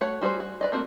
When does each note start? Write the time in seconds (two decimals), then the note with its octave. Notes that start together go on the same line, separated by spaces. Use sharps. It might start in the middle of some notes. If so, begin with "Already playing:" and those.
0.01 A3 F#4 C#5 F#5
0.21 G3 F#4 G#4 B4 C5
0.40 F#4
0.61 B4 D5 D#5
0.72 A3 A#3 C4 F#4